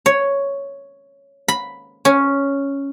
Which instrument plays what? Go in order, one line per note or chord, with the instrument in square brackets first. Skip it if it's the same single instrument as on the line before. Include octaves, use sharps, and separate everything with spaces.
[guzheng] C#5
B5
C#4